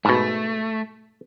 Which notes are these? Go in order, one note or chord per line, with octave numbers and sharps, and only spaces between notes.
G#2 B2 A3